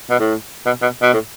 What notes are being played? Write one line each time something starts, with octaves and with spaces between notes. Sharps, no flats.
B2
A2
B2
B2
B2
A2